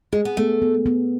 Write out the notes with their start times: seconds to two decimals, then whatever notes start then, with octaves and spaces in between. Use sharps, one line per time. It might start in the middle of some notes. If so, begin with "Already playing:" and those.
0.12 G#3 G#4
0.25 B3
0.37 A3 B3
0.62 B3
0.86 B3